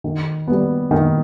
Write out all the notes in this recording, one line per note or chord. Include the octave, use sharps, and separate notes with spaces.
D#3
G3 B3
D#3